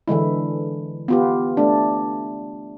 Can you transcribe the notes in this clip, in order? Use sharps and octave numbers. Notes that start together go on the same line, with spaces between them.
D3 E3 G#3 E4
B3 F4 G4
A3 D4